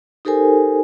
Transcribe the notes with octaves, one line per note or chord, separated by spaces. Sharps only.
D#4 G4 A4 A#4 C5 G#5